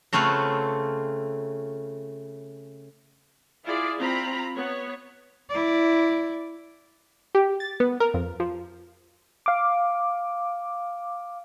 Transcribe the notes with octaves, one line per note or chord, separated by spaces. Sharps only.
C#3 A3 C4 F4 B4 C#5
E4 F4 G#4 D5
C4 F4 A#5 B5
B3 C#5
E4 D5
G4
A6
B3
A#4
F2
F3
F5 D6